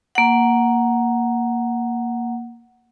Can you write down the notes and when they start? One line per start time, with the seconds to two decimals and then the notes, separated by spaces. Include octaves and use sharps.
0.15 A#3 F#5